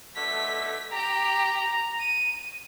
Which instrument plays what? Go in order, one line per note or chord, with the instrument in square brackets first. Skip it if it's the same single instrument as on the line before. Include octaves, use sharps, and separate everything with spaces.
[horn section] B2 D3 A3 [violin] B6
[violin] G4 G5 [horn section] A#5
[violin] D#7